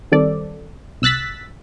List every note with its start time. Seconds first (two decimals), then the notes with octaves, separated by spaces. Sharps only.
0.12 D#3 G3 C4 A4 D5
1.02 C2 E6 F#6 A6 B6